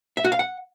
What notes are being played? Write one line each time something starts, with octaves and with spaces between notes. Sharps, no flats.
E5
F#4
F5
F#5